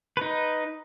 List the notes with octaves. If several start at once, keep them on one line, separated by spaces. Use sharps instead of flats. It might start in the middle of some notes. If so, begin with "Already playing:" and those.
D#4 B4